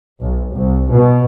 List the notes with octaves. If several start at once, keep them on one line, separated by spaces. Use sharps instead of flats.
B1
C2
B2